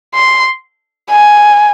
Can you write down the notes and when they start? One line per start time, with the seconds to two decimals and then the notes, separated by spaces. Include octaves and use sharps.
0.15 C6
1.10 G#5